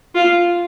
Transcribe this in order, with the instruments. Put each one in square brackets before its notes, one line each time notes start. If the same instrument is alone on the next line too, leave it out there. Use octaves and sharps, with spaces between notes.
[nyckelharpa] F4